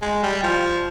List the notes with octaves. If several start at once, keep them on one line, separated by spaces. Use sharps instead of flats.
G#3
G3
F3